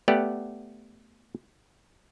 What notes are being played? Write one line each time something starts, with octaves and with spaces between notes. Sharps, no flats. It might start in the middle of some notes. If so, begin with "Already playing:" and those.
A3 B3 G4 D5 F#5